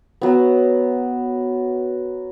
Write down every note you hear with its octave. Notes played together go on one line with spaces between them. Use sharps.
F#3 B3